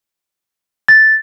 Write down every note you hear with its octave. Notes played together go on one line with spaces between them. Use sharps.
A6